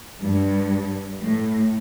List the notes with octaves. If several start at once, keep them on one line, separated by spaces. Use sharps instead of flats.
G2
A2